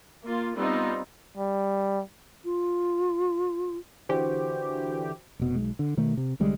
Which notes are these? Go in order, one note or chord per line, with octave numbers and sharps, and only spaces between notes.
A#3 F4
G3 B3 C4 D#4 F4
G3
F4
D3 E3 F#4 G4 C5
F1 B2
B1 G#3
D3
B2 D#3 A3
C3
C2 D3 G3 G#3